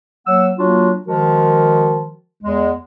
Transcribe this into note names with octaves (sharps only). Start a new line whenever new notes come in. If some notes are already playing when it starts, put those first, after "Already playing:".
F#3 A#3 F#5 E6
F#3 A#3 D4 F4 F#4
D#3 F3 G#3 F#4 A#4
E2 G#3